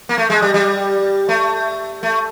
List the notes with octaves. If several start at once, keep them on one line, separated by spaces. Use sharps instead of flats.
A#3
A3
G#3
G3
G3
A3
A3